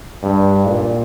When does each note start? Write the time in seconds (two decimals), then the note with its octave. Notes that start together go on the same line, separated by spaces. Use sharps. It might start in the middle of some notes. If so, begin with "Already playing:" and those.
0.23 G2
0.68 A#2